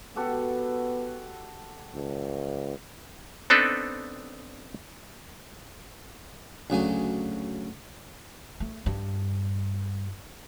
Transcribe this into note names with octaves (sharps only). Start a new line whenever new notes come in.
B3 F#4 G4 A4
C#2
B3 C4 D4 D#4 A4 B4
D2 C#3 F#3 G#5
A3
G2